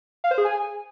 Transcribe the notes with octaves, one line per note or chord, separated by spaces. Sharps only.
F5
C5
G#4
G#5